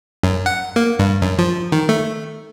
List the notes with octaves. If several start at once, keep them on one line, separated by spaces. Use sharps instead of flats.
F#2
F#5
A#3
G2
F#2
F3
D#3
A3